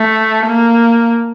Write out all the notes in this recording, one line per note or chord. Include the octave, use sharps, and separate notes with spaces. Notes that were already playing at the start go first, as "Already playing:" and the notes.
Already playing: A3
A#3